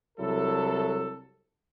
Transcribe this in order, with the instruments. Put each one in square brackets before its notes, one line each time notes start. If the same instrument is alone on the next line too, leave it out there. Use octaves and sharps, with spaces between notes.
[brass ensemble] C2 F#3 E4 A4